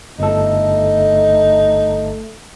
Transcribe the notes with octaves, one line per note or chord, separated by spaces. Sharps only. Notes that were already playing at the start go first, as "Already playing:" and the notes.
G1 A3 D#4 A4